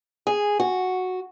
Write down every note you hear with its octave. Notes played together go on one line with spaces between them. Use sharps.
G#4
F#4